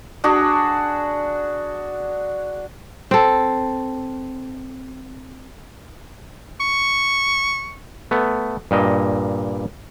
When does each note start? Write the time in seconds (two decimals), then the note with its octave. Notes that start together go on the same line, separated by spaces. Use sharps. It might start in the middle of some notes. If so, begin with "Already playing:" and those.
0.24 D4 F#4 G#4
3.11 C4 A4
6.61 C#6
8.11 A3 B3
8.71 G2 A#2 D#5